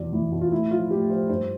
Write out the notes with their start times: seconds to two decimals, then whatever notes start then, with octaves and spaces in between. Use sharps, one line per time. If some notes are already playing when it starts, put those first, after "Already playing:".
Already playing: E2 B2 D5
0.13 E2 E4
0.32 B2
0.41 F4
0.52 A2 E4
0.71 F3 F4
0.91 A2 G4
1.10 F3 C5
1.29 G2 C5